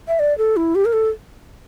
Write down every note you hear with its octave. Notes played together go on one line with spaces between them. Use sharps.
E5
D5
A4
E4
G4
A#4
A4